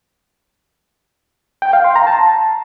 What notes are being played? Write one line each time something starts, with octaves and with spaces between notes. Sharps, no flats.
G5
F5
C6
A#5
A5